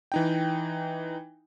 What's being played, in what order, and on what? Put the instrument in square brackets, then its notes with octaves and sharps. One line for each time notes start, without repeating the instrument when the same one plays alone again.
[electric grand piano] E3 D#4 G5